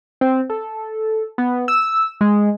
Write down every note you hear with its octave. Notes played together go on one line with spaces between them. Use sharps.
C4
A4
B3
E6
G#3